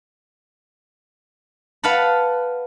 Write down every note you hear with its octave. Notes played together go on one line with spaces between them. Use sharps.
B4 F5 F#5 A5 B5